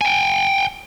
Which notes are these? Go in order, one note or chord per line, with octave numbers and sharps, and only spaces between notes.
G5 G#5